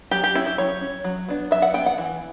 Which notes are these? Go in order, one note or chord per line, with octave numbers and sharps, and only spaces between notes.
F#3 G4
G4
C#4 E4
G4
F#3 C#5
C#4
F#3
B3 D4
F#3 E5
F#5
B3 D4 G5
F#5
E3